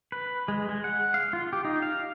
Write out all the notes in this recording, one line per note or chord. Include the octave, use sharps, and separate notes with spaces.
B4
G#3
G#3
F#5
F5
F4
G4
D#4
F5